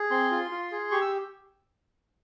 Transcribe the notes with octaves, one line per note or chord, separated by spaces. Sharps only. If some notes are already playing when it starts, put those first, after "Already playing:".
Already playing: G#4
C4 C6
F4
F4
G#4
G4 C#6
E6